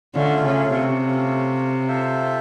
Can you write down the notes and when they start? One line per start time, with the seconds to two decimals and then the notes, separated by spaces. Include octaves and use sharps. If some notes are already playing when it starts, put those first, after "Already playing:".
0.15 D3 A3 C#4 F4
0.44 C#3
0.73 C3
1.02 A3 C#4 F4
1.88 C4 F4 A4 C5 E5